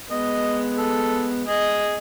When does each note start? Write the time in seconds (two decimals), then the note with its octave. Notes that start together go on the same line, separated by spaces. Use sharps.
0.11 G#3 B3 D#5
0.78 A4
1.48 G#4 D#5